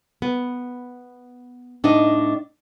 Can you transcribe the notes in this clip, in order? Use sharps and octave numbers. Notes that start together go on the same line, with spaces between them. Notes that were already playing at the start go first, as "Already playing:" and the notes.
B3
A2 D4 D#4 D#5